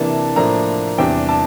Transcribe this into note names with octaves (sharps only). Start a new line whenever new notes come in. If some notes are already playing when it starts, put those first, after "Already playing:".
Already playing: C3 E3 A#3 D4 A5
A2 F3 A#3 D4 A#5
E2 C3 G3 D4 G5
A5